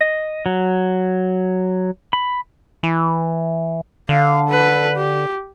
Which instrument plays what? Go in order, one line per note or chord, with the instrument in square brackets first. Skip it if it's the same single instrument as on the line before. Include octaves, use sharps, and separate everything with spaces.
[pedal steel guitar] D#5
F#3
B5
[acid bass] E3
[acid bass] D3 [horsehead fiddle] F5
[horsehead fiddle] A4 B4
G4